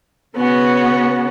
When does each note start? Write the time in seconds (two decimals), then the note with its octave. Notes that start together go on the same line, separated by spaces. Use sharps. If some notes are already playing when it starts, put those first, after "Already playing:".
0.37 C#3 B3 C#4 F#4